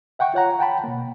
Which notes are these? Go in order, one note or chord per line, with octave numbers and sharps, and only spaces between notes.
E5 F#5 G5 C#6
F4 C#5 F#5 A#5
F#5 G5 A5 B5
B2 A#3